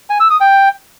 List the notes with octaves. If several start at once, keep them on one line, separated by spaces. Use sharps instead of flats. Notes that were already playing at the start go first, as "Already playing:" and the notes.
G#5
E6
D#6
G5